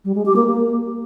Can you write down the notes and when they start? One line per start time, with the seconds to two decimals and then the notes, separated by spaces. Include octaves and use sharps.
0.05 G3
0.15 G#3
0.25 G4
0.36 A#3
0.46 A#3